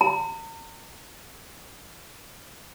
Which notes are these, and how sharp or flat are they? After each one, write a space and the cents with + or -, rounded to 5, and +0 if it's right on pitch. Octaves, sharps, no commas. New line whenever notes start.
A#5 -45